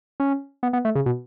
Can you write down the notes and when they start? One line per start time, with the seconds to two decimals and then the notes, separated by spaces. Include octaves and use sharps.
0.20 C#4
0.63 B3
0.73 B3
0.85 A3
0.95 C#3
1.06 B2